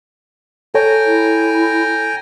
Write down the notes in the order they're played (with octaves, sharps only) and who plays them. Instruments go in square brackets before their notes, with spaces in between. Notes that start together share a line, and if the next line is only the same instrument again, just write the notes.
[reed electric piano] A4 C#5 [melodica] G5 G#5 A#5
[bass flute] E4